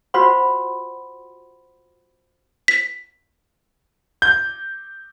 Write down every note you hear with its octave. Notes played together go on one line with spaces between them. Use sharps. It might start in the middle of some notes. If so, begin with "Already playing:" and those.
F4 F#4 C5 F#5 B5 C6
B6
G6